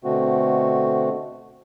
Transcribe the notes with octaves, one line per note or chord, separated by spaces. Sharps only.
B2 D3 A3 C4 F#4